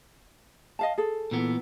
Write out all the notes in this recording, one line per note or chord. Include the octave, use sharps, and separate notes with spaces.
D#5 F5 A5
G#4 A4
A#2 E3 B3